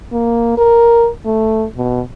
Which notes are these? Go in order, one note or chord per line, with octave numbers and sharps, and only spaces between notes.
A#3
A#4
A3
B2